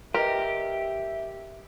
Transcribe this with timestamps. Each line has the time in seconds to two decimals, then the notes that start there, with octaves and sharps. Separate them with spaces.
0.14 G4 A#4 B4 D#5 E5